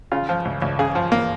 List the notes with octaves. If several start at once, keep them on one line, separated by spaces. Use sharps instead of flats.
C#3 F4
F3
C#2
C#2
C#3 G#4
F3
A#3